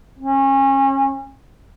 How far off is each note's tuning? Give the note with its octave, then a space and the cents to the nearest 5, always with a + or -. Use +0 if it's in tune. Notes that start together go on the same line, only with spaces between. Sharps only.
C#4 -30